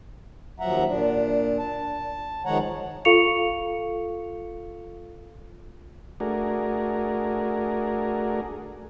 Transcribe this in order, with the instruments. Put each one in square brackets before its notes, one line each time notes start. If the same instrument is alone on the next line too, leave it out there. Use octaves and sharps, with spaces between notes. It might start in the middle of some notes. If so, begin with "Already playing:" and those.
[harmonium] D#2 F3 F#3 E5 F#5 A#5
A#2 D4
A5
D#3 F3 G#3 C#5 F#5 A#5
[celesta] F4 A4 F5 C#6 C#7 F7
[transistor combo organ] A3 D4 F#4 G#4 A#4